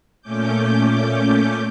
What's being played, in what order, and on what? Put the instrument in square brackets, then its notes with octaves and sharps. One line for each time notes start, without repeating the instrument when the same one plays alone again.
[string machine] A#2 A3 C#4 D6 G6